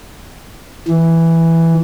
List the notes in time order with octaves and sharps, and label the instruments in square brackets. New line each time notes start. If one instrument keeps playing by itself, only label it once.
[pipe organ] E3